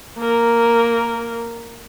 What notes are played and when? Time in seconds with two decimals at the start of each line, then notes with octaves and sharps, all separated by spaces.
0.18 A#3 A#4